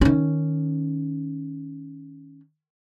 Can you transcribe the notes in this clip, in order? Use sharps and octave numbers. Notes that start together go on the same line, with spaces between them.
D#3 C#4